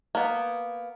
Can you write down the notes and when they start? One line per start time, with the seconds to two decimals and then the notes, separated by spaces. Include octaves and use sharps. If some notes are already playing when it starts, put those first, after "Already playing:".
0.15 A#3 B3